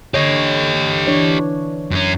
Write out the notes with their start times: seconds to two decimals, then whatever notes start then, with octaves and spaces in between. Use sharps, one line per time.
0.14 D3 G4 C#5 D#5
1.07 E3 D4 C#5
1.91 F#2 C#4